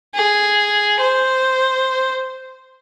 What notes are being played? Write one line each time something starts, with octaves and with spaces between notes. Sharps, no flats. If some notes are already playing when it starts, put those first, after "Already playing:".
G#4
C5